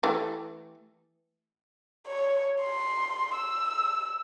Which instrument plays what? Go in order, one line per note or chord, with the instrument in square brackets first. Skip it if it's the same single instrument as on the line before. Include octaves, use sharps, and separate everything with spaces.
[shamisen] E3 A3 G4
[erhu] C#5
C6
E6